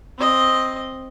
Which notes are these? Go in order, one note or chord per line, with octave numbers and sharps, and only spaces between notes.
C4 D#5